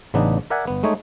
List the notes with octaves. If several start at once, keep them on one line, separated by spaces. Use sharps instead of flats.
A1 C#3 B3 D4 D#4
A#4 D5 E5 F#5 G#5
G1 B3
G#3 A3 D#4 C#5